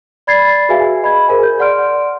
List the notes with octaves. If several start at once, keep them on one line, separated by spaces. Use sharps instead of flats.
D5 B5 G#6 A6 C7
F#4 G#4 B4 E5 F5 G#5
D#5 B5 G#6
G#4 A#4 C5 G#5
G6
D5 F#5 C6 F6 D7